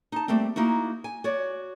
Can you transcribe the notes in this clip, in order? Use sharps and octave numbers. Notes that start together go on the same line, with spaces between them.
D#4 A5
G3 A3 A#3 C4
A#3 D#4 E4 F#4
G#5
F#4 C#5 D5